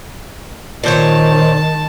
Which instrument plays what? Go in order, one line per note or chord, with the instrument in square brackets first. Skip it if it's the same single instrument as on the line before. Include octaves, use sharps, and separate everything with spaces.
[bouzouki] A#2 C5 C#5 [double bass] D#3 [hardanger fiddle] A5